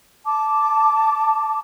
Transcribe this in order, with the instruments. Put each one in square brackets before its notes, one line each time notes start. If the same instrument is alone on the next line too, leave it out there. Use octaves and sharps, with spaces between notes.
[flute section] A5 D6